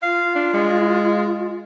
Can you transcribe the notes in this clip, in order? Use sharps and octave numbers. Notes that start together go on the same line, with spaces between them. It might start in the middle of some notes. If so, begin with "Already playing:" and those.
F4 F5
D4
G#3